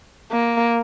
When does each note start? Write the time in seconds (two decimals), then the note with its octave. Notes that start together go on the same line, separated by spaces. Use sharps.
0.31 A#3